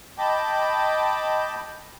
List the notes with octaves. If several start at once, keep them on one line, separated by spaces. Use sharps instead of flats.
D#5 G5 A5 B5 D6 G6